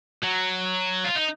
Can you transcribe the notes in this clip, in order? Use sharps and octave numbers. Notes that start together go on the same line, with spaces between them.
F#3
F4
D#4